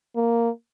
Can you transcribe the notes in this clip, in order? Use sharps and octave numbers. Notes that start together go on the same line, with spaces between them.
A#3